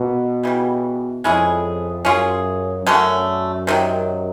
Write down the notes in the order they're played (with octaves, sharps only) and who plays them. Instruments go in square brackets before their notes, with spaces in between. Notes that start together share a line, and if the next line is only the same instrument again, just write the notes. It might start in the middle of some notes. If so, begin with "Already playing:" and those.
Already playing: [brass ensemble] B2 [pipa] A#3
[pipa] C#3 E3 G3
[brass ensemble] F2 [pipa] G#3 C#4 E4 G#4
[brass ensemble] F#2 [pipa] C#4 F4 G#4
[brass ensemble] F#2 [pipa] D3 F#3 A3 C#4
[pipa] C3 D#3 F#3